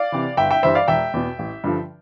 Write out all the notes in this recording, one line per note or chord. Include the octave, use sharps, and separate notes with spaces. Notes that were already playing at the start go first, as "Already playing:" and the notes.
Already playing: D5 F5
C3 E3
G1 E5 G5
E5 G5
G2 E3 G3 C5 E5
D5 F5
E1 E5 G5
E2 B2
A1
G2 D3 F3